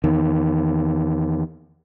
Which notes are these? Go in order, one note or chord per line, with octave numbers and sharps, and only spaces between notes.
E2 D#3